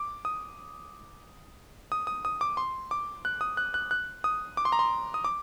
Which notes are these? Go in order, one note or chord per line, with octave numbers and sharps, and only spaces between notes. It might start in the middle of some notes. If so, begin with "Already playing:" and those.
Already playing: D6
D#6
D#6
D#6
D#6
D6
C6
D6
F#6
D#6
F#6
F#6
F#6
D#6
D6
C6
A#5
C6
D#6
D6